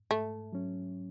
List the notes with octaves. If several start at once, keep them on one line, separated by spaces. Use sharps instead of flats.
G#2 A3
F#3 C#4